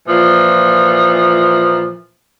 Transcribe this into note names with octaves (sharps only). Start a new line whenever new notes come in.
A#2 E3 F3